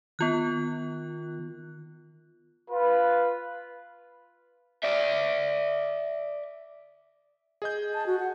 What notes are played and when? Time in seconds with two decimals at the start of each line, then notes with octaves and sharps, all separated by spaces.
0.19 D#3 B3 F4 F#6
2.68 F4 B4
4.84 D5 E5
7.62 G#4 D#5 G6
7.94 A5
8.06 F#4
8.20 F#5